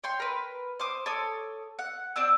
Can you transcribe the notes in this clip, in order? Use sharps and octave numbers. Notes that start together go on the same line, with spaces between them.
C#5 G5 C6
A#4 B4
C5 D6 D#6
A4 C#5 D6 D#6
F#5
C4 D4 D#6 E6